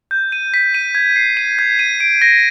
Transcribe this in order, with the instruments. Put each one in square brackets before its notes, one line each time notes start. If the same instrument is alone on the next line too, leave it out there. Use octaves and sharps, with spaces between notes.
[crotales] G6
D#7
B6
D#7
G#6
C7
D#7
G#6
D#7
D7
A#6